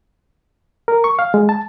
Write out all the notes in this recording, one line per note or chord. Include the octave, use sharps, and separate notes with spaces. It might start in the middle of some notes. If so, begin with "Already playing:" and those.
A#4
C#6
F5
G#3
A5